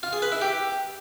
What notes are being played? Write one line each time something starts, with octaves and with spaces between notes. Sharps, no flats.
F4
G#4
B4
E4
G4